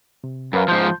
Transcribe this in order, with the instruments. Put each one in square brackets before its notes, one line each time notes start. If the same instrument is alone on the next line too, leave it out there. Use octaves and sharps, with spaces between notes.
[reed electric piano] C3
[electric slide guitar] F#2 [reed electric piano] A#4 B4 F5
[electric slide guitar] G#2 F3 [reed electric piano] A5 C6 G6